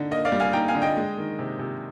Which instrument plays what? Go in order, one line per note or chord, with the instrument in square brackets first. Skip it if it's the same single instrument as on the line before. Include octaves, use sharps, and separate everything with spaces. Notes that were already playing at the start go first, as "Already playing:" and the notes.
Already playing: [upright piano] D3 D#4
A#3 D#5
D5 F5
G3
F5 G#5
D#4 G5 A#5
F5 G#5
D3
D#5 G5
G#3
D#3
C3
C3